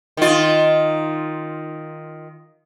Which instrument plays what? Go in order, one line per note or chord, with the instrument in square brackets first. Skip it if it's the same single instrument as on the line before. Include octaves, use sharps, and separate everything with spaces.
[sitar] D#3 F4